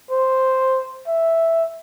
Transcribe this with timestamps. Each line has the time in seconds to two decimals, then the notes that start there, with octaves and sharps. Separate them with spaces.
0.11 C5
1.07 E5